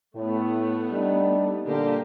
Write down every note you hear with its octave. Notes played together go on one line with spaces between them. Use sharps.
A2 A3 B3
G3 D4 D#4
A#2 D3 G3 A#3 G4